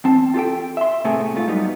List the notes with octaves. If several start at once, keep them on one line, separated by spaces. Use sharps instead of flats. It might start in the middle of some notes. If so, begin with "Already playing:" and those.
E2 C4 A5
F4 G4 A4 G5
E5 C6
A2 C3 A3 B3 C4 G#4
G#2 A3 F4
F#3 G3 B3 D#4